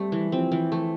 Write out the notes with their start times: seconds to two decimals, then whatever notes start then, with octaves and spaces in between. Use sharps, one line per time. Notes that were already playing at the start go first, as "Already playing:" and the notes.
Already playing: G3 A3 C4
0.12 E3
0.32 F3 C4
0.52 E3
0.72 A3